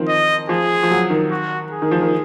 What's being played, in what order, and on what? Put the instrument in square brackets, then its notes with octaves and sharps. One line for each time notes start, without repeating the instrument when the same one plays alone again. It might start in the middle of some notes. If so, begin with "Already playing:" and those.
Already playing: [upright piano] D#3 F3 C4
[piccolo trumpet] D#5
[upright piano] F3 [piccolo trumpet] G#4
[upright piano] F3
F#3
D#3
[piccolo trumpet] F#4
G#4
[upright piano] D#3
F3
D#3